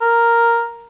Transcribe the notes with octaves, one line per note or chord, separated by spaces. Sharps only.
A#4